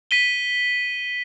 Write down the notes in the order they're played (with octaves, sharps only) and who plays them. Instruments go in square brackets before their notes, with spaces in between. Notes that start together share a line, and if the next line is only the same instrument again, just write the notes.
[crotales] B6 D#7 G7